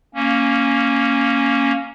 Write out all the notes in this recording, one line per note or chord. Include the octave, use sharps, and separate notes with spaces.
A#3 C#4